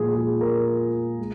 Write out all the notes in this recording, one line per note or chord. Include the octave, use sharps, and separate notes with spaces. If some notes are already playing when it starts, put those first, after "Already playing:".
Already playing: A#2 F3 G#3 F4 G#4
G#4
A#4
G#3